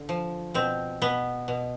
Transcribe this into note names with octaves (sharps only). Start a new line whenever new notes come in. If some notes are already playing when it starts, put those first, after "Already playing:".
Already playing: D3
F3
B2 C4
B2 B3
B2